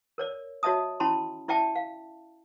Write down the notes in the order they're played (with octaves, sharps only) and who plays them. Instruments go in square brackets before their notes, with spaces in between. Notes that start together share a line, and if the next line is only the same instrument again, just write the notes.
[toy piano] A#4 C#5 D5
F#4 C#5 D#5 E5 A5 D#6
C#4 E4 A5 B5 C6
E4 D5 E5 G5 A5
F5